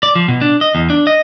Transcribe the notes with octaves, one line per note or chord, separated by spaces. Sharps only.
D5
F3
B2
D4
D#5
E2
D4
D#5